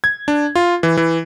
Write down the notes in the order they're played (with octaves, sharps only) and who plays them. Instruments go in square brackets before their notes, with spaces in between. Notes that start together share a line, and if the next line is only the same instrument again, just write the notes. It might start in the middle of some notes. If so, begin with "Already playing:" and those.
[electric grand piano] G#6
D4
F4
E3
E3